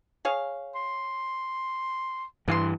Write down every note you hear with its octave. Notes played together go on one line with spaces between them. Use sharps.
G#4 C#5 F5
C6
G2 E3 B3 F5 C6